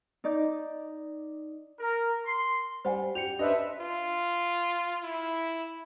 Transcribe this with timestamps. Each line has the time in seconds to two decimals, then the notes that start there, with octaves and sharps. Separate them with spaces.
0.24 D#4 D5 D6 G6
1.79 A#4
2.25 C6
2.85 G3 C5 F#5 G#5
3.15 G4 C#7 F7
3.39 D4 B4 C5 D#5 E5
3.80 F4
5.03 E4